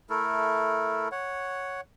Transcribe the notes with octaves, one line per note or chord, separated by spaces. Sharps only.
A3 E4 A4 A#4
C#5 F#5